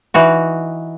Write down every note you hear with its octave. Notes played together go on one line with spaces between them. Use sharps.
E3 D#4 F#4